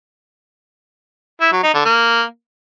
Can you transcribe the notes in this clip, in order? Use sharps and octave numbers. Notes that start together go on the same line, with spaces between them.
E4
F#3
D#4
D3
A#3